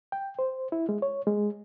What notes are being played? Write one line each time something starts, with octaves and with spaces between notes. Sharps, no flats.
G5
C5
E4
G#3
C#5
G#3